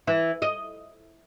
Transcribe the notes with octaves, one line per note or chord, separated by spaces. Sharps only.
E3
D#5